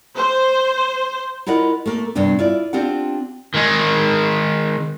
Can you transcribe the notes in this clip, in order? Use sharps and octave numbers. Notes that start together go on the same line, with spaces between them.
C5
E4 F4 A#4 D#5 F#5
A3 A#3
G2 C3 B3 D4
E4 F4 D5
C4 D4 F4 G4 F#5
D#3 G#3